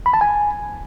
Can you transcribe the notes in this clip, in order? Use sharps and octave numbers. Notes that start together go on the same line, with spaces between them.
B5
A5
G#5